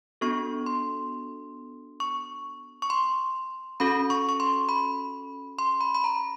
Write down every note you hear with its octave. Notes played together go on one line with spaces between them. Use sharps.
B3 D4 F#4 A4 C#6
C6
C#6
C#6
C6
C#4 F#4 A4 B5
C#6
C#6
C6
B5
C6
B5
B5
A#5